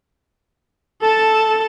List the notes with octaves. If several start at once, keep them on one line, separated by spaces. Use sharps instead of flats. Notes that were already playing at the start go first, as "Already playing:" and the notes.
A4 A5